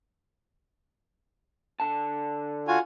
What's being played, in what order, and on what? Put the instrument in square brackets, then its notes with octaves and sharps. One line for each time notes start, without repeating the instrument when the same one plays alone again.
[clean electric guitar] D3 A5
[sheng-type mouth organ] F4 F#4 G#5